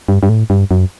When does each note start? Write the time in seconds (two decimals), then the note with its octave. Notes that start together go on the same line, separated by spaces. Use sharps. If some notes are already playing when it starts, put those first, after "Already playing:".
0.08 G2
0.23 G2
0.29 A2
0.50 G2
0.71 F#2